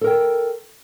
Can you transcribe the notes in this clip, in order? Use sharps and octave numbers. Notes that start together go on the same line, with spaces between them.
A4 A#4 G5